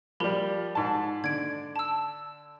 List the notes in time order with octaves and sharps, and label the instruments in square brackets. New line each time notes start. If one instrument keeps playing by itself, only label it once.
[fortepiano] F3 G3 [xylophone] G4 A#4 B5
[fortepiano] G#2 A5
[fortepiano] D3 [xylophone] G#6 D7
[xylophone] A5 E6